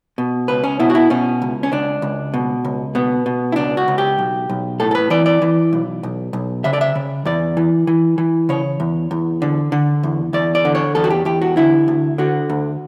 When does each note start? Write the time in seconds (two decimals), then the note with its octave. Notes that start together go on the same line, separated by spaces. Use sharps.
0.18 B2
0.48 C#2 B4
0.64 C#4
0.80 B2 E4
0.90 F#4
0.95 E4
1.10 B2 C#4
1.42 C#2
1.63 C#4
1.72 C#2 D4
2.02 C#2
2.34 B2
2.65 C#2
2.95 B2 B3
3.26 B2
3.52 E4
3.56 C#2 D4
3.77 F#4
3.88 C#2
3.98 G4
4.19 B1
4.50 B1
4.80 A2 A4
4.91 A4
4.95 B4
5.10 E3 D5
5.26 D5
5.42 E3
5.73 B1
6.03 B1
6.33 B1
6.64 C#3 E5
6.73 D5
6.81 E5
6.95 C#3
7.25 E2 D5
7.57 E3
7.87 E3
8.18 E3
8.49 C#3 C#5
8.80 E2
9.11 E2
9.42 D3
9.72 D3
10.03 E2
10.33 E2 D5
10.55 D5
10.65 D3
10.75 C#5
10.95 E2 A4
11.04 F#4
11.10 G4
11.25 E2 G4
11.42 F#4
11.57 D3 E4
11.88 D2
12.18 D3 F#4
12.50 D2